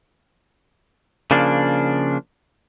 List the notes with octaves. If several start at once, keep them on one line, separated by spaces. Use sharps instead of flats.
C#3 F3 A#3 D4